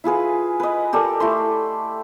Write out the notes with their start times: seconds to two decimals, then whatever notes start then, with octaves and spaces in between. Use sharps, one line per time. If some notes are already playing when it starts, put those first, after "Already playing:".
0.04 E4 F4 G#4 B4
0.60 B4 D#5
0.93 G4 A4 A#4 D5
1.20 A3 E4 C6